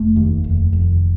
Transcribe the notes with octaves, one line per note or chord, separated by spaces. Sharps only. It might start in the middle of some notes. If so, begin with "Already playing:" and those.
Already playing: F1 A3
D#2
F1
F1